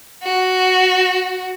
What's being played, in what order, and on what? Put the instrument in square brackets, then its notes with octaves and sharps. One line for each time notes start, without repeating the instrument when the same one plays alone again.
[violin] F#4